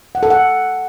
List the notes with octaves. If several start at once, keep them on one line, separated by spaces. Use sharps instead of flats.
F#5
A4
F#5